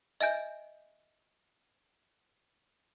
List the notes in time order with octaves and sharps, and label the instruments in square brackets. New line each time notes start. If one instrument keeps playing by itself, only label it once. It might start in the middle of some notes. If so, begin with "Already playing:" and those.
[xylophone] D#5 E5 G#5 G6